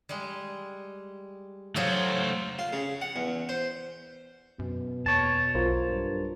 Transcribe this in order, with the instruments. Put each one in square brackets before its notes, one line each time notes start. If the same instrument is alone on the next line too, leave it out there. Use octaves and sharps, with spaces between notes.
[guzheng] G3 G#3
[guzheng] F#3 F4 G#4 [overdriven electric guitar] A3 C5
[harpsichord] F4
C#3
F#5
E2
C5
[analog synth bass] F#2 [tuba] B2
[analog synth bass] E2 [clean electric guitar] C#5 A5
[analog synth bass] B1 [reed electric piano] F4 A#4 C5
[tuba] G2